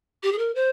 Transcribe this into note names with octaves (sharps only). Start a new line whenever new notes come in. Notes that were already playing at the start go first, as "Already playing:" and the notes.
G4
G#4
A#4
C5